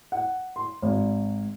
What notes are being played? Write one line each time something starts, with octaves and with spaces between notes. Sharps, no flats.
F#5
C6
G#1